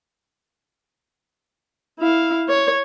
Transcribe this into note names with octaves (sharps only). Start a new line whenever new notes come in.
E4 F5
C#5